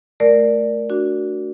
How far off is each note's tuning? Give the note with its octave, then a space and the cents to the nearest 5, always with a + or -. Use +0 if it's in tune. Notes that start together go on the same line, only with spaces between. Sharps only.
A3 +0 A#4 +0 D5 +0
D4 +0 F#4 +0